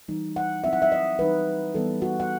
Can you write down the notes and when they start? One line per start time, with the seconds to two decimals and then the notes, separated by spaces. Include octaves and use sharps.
0.08 E3 G3 D#4
0.36 F#5
0.64 F#3 C4 E4 E5
0.73 F#5
0.82 E5
0.92 D#5
1.19 E3 G3 D#4 B4
1.75 E3 G3 B3 A4
2.02 F#4
2.20 F#5